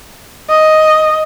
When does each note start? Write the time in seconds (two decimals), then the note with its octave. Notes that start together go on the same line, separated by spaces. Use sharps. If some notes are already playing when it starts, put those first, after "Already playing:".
0.50 D#5